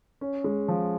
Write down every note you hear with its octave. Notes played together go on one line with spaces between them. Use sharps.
C#4
G#3
F3